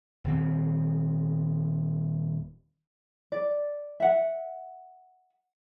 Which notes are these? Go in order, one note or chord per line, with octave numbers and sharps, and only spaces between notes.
D#1 D#3 C4
D5
E5 F#5